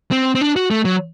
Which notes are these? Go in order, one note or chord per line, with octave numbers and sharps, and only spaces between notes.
C4
C4
D4
F#4
A3
F#3